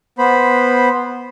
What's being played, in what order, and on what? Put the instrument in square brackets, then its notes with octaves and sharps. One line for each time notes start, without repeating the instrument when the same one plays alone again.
[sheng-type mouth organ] B3 C5 B5